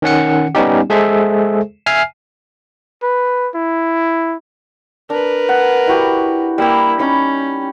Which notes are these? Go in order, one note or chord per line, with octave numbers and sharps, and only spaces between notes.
D#3 C#4 F#5 C#7
G3 B3 C#4 D#4 G4
G#3 G#4 A4 C5 E5
E5 G#5 F6 C7
B4
E4
D4 A#4 B4
F#5
E4 F#4 G4
G3 A#3 E4 G4
C#4 D#4 B5